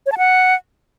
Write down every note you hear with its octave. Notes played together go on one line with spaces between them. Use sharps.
C#5
A5
F#5